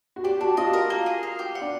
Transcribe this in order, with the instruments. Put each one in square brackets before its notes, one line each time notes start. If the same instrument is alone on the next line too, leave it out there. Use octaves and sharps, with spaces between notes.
[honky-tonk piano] F#4
[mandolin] D4 [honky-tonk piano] G4
[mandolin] D4 [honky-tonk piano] F#4
[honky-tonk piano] F4 [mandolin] D#5
[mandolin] A#4
A#3
G#4
F5
G4
F#5
[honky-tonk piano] D4